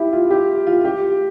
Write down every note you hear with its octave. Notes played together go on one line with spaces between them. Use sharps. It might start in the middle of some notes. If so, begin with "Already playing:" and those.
Already playing: E4 G4
F4
G4
F4
G4